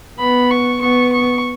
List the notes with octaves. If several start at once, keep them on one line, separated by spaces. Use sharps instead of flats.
B3 B5
C#6
B3 C#6
C#6